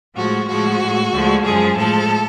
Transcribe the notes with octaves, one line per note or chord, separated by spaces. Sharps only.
A2 F3 G#3 F#4
A2 F3 G#3 F#4
A2 G#3
D2 D3 F3 G#3
F#2 F3 G#3 G#4
A2 F3 G#3 A4